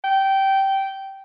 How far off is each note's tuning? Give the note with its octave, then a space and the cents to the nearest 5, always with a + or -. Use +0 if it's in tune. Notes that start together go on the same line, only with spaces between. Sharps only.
G5 -15